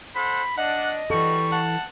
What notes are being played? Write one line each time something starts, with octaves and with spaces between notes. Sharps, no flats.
A4 C5 F#5 B5
D4 D#5 F#5
E3 G3 F#4 A4 C#6
F#5 A5